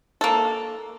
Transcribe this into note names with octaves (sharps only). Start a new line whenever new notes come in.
A#3 A4